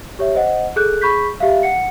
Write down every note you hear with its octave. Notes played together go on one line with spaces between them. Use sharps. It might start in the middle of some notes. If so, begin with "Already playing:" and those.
G4 C#5 E5
C5 D#5 F#5
G#4 A4 F#6 G6
G#4 B5 C#6 G6 B6
G4 E5 F5
F#5 C#7